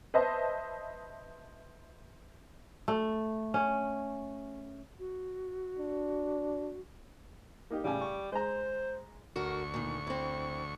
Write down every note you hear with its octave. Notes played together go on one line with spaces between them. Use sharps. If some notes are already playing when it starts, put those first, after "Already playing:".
B4 C5 D#5 E5 A5
A3
C#4
F#4
D4
A#3 D#4 G4
A1 C#3 G3 G#5
C#6
G#3 C5 A#5
D2 F#4 A#4 C#6
A#2 D#3
C4 E4